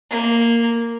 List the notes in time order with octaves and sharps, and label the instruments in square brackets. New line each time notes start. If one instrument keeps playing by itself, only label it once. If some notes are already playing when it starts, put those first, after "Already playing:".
[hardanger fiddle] A#3